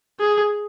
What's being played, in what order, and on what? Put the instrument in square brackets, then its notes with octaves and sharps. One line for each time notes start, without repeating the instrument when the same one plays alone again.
[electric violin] G#4